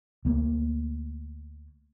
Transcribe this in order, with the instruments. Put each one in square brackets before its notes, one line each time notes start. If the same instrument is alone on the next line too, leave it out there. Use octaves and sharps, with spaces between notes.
[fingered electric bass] D2 A3 A#3